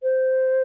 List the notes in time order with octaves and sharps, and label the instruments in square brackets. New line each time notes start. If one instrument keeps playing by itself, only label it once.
[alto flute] C5